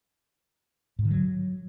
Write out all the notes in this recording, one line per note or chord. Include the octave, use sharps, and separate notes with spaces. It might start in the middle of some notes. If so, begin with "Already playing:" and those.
G#2
D3
F#3